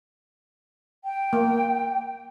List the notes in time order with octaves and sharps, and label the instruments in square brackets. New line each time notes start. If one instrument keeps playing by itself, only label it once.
[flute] G5
[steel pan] A#3